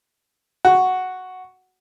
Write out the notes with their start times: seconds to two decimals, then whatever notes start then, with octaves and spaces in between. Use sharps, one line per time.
0.65 F#4